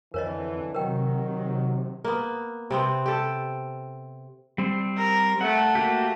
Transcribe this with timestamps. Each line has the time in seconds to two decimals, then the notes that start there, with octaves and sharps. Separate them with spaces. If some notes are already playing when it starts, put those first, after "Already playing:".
0.14 F2 D3 E3 A#4 C#5 D#5
0.75 C3 D#3 F#3 A#4 G5
2.04 A#3 B3
2.71 C3 B3 C4
3.06 G4 A4
4.58 G3 C4 C5
4.97 A#4
5.41 A3 F#5
5.75 A#3 F#4 G4